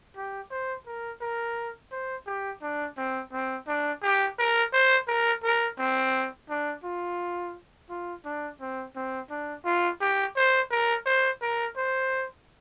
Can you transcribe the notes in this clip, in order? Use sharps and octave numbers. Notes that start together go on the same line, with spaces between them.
G4
C5
A#4
A#4
C5
G4
D4
C4
C4
D4
G4
A#4
C5
A#4
A#4
C4
D4
F4
F4
D4
C4
C4
D4
F4
G4
C5
A#4
C5
A#4
C5